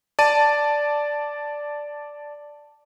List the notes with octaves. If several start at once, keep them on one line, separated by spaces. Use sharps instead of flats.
D5 A5 D#7